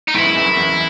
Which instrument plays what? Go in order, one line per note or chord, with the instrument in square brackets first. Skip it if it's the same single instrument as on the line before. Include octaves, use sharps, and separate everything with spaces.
[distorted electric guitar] D#4
[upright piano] E2 G#2 [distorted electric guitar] E4
[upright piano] F#2
E2
F#2
E2